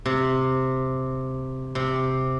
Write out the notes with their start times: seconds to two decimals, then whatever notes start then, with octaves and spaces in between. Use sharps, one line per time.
0.06 C3
1.75 C3